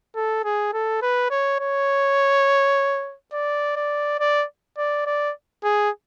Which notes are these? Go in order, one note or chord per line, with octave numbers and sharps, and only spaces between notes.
A4
G#4
A4
B4
C#5
C#5
D5
D5
D5
D5
D5
G#4